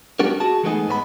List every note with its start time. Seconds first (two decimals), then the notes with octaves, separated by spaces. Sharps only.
0.19 G3 B3 D4 F#4 G4 A#4
0.40 F#4 G#4 A5
0.63 E3 G#3 A3 B3 D#4 G#4
0.88 G#2 B3 C5 B5